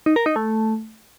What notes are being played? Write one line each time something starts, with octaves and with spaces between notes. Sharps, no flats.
D#4
A#4
D#4
A3